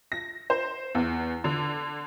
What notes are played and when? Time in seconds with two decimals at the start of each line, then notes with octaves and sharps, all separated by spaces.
0.12 A#6
0.50 C5
0.95 E2
1.44 D3